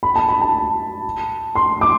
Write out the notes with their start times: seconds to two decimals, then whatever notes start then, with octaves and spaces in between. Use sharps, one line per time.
0.03 B5
0.16 A5
0.28 B5
0.41 A5
1.55 C6
1.81 D6